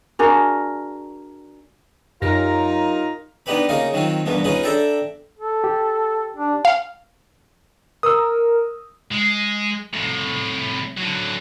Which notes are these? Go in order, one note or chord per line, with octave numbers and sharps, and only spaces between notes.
D4 F#4 G#4 A#4
F#2 D#4 F4 G4 A#4 A#6
B3 D4 D#4 G4 B4 B5
C#3 A#3 D#4 F4 A#4 F5
D#3 F#3 C4 F4
E2 G2 B2 A#3 B3
C#4 D#4 F4 G#4 B4
D4 A4 E5 G5 A5 A#5
A4
G4
D4
F5
A#4 D#6 E6
G#3
C2 A2
D3 F#3